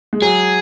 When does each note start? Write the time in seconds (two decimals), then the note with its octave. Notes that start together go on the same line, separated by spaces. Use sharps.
0.13 G#3
0.22 F#3 G#4